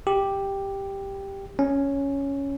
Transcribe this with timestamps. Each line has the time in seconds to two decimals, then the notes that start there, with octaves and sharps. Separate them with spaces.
0.07 G4
1.59 C#4